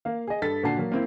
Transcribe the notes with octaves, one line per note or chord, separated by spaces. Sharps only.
A#3 F5
G#4 D#5
G2 A4 A6 B6
A#2 D3 F#4 A5 C7
F#3 A#3
A#3 C4 E4